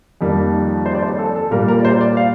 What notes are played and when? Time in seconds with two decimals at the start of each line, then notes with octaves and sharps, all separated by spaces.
0.21 F2 D#3 G3 A#3
0.86 C5
0.95 D5
1.02 C5
1.19 A4
1.36 A4
1.51 A#2 G3 A#3 A#4
1.68 A#4
1.80 D5
1.85 C5
2.01 D5
2.17 F5